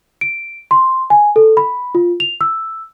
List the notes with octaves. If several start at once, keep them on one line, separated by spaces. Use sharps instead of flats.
D7
C6
G#5
A4
B5
F4
F7
E6